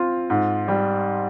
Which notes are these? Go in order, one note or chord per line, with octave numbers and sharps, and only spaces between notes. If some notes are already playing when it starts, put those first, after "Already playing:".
Already playing: C4 F4
G#2
G3